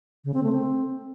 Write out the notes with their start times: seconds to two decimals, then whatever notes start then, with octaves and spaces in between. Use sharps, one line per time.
0.25 C#3
0.34 C4
0.43 A3
0.53 C4